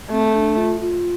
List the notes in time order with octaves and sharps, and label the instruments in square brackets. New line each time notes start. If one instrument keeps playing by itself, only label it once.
[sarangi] A3 [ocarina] C4
[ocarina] D4
F4
F4